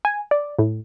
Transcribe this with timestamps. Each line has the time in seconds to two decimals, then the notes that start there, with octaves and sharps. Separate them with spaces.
0.05 G#5
0.31 D5
0.59 A2